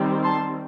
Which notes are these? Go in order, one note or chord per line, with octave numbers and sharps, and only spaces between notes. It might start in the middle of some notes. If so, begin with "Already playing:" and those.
Already playing: D#3 G3 C4
A5 C6